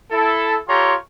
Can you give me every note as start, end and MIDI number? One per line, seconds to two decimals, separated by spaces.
0.11 0.55 64
0.11 0.55 69
0.68 0.95 65
0.68 0.95 67
0.68 0.95 69
0.68 0.95 73
0.68 0.95 82
0.68 0.95 84